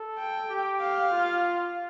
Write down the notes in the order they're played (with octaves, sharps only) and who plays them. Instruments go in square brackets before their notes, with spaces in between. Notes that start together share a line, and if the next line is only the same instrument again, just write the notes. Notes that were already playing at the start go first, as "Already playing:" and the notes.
Already playing: [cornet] A4
[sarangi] G5
[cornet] G4
[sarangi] F5
[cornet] F4